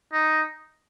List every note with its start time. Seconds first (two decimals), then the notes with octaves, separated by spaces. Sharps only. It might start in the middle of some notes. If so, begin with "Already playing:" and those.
0.13 D#4